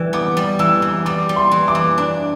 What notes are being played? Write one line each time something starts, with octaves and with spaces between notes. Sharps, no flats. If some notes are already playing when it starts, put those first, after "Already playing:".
Already playing: E3 G3
B3 D6
G3
E3 E6
E3
G3 D6
G3
C6
E3
D6
E3
D4